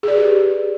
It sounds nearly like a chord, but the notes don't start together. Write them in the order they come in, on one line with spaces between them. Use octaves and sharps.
G#4 D5 B4 G4